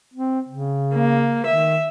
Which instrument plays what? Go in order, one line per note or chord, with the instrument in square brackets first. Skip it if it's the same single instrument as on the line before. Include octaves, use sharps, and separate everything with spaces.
[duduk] C4
C#3
[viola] A#3
[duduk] D#3 [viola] E5